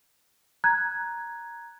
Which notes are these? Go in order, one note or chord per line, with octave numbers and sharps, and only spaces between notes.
A#5 F#6 G#6